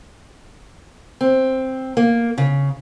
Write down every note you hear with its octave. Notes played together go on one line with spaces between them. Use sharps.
C4
A#3
C#3